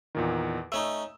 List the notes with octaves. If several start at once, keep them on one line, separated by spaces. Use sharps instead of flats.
E2 A#2 D#3
A3 C#4 D#4 E6